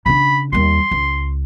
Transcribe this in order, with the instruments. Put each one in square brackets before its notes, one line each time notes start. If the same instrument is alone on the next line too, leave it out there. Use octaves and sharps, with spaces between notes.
[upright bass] C#3 D4 [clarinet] B5
[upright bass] D#2 G3 [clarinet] C6
[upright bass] C#2